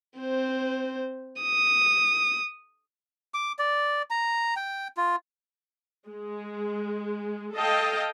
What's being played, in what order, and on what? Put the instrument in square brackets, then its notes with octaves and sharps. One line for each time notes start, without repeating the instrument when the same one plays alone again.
[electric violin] C4 C5
D#6
[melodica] D6
D5
A#5
G5
F4
[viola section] G#3
A4 D#5 F5 G5 A5